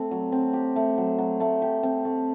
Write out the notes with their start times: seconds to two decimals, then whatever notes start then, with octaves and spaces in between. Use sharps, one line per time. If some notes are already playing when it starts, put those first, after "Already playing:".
Already playing: A3 C4
0.11 F#3
0.32 C4
0.53 G4
0.76 A3
0.98 F#3
1.18 F#3
1.40 A3
1.62 G4
1.83 C4
2.05 A3